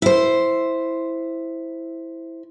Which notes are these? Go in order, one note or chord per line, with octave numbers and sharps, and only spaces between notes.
E4 C5